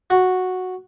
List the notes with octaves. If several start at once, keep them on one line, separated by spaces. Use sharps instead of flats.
F#4